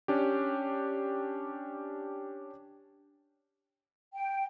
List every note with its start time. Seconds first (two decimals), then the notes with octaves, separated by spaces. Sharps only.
0.08 C#4 D4 G4
4.14 G5